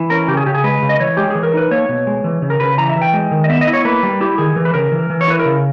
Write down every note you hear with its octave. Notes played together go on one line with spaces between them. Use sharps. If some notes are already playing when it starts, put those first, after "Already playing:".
Already playing: E3
C#4 A#4
C#3 G4
G#4
C#3 G4
G#4
G#3 B4
C#3
D#5
E3 C#5
G#3 G4
E3 G#4
A#4
D#4 B4
A#3 C#5
B2
G#3
E3
C#3
A#4
C#3 B4
E3 A#5
E5
E3
G5
G#3
D#3
D#5
B3 E5
D#5
E4
C#5
A#3 B4
G3
E4 G4
D#3 G#4
E3
B4
C#3 A#4
E3
E3
C#5
E4 B4
A#4
C#3